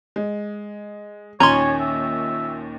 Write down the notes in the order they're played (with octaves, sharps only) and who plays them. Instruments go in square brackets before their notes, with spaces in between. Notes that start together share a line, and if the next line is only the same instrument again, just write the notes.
[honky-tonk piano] G#3
[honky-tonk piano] D#2 A#2 D#3 [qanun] C#4 G#5 [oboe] C#5 [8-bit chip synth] A#5 C6
[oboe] E5